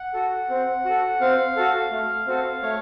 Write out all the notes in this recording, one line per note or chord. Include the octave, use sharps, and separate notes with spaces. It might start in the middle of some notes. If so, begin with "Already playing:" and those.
Already playing: F#5
F#4 A4
C4
F#4 A4
C4 F5
F#4 A4
A3
C4 F#4 A4
A3 C#5